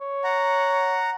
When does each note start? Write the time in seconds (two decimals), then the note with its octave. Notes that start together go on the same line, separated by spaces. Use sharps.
0.01 C#5
0.24 F#5 A#5